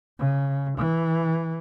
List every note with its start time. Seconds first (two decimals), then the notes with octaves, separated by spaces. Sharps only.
0.19 C#3
0.77 E3